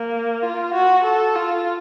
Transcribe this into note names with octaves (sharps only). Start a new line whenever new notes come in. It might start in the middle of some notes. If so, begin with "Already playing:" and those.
Already playing: A#3
F4
F#4
A4
F4